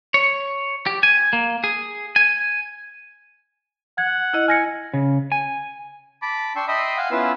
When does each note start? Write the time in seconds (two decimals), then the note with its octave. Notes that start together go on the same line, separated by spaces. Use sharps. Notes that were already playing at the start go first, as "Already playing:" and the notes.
0.14 C#5
0.86 G4
1.03 G#5
1.33 A#3
1.64 G#4
2.16 G#5
3.98 F#5 G#6
4.34 E4 D#5
4.48 G#5 F6 A#6 C#7
4.94 C#3
5.32 G#5
6.22 A5 B5 D6
6.56 D4 G5 C6 C#6 E6
6.68 D#5 E5 G5 B5 C6 D#6
6.97 F5 F#5 G#5 C6
7.11 B3 C#4 E4 F4 B4 E6